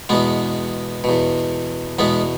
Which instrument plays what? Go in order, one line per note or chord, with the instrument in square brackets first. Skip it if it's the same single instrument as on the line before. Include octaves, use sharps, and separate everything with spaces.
[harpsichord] E2 B2 G#3 B3
E2 B2
E2 B2 G#3 B3